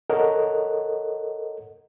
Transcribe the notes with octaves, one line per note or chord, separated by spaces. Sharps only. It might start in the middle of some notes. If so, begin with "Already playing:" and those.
A4 A#4 C#5 D#5 F#5